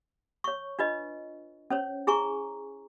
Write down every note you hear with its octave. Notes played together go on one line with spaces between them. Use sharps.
C#5 C#6
D4 F4 B4 D#5
C#4 C5 C#5
E4 G#4 G#5 A#5 C#6